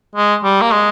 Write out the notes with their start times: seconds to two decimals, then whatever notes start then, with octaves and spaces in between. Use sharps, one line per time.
0.15 G#3
0.44 G3
0.61 A#3
0.72 G#3